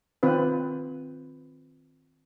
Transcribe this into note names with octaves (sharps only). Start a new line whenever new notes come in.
D#3 C4 F4 B4